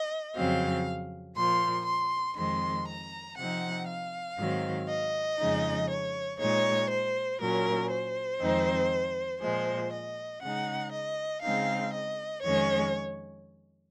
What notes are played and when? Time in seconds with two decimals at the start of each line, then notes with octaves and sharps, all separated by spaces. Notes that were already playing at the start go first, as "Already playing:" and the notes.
Already playing: D#5
0.35 F2 C#3 F#3 C4 F5
1.36 A#2 F3 A#3 C6
1.86 C6
2.36 F2 D#3 G#3 C4 C6
2.87 A#5
3.37 C3 F3 C4 D#4 F#5
3.88 F5
4.38 G#2 D#3 F#3 C4
4.88 D#5
5.38 F2 C#3 F3 G#3 D#4
5.89 C#5
6.39 A#2 G#3 D#4 C#5
6.90 C5
7.39 A#2 F#3 C#4 A#4
7.90 C5
8.40 F2 D#3 G#3 C4 D#4
9.41 A#2 F3 G#3 C5
9.91 D#5
10.41 C#3 G#3 D#4 F#5
10.92 D#5
11.42 C#3 G#3 C4 D#4 F5
11.93 D#5
12.43 F2 D#3 G#3 C#4 C#5